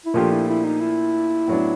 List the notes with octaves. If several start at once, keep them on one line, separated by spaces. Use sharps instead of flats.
E4
A#2 F3 A3 D4 F4 G4
E4
E4
D#4
E4
A2 F#3 B3 D4